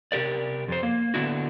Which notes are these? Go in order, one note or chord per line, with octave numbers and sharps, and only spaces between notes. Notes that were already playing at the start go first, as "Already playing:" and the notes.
C3 G4 A#4 D5
F2 C5
A#3
D3 B3 D4 E4 F#4